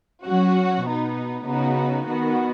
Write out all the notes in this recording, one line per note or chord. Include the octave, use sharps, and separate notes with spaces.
F#3 C#4 F#4
B2 B3 D#4
C#3 B3 D#4 F#4
D#3 B3 F#4